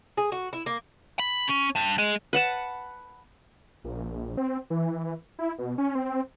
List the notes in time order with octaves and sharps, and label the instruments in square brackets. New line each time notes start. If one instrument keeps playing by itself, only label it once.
[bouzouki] G#4
F#4
E4
A#3
[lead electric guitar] B5
C#4
G2
G#3
[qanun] B4 F#5 A5
[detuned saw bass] A#1
C4
E3
E4
B2
C#4
C4